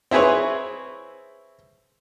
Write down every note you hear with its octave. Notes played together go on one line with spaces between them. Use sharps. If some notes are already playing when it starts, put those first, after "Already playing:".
C4 E4 G#4 B4 C#5